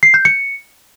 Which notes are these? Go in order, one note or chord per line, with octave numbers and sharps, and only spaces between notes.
C7
G6
C#7